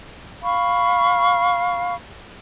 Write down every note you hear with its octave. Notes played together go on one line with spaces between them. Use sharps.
F5 B5 C#6